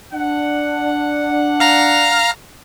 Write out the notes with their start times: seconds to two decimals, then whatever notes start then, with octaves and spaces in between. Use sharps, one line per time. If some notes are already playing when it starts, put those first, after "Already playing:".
0.13 D4 F#5
1.60 F5 A#5 F6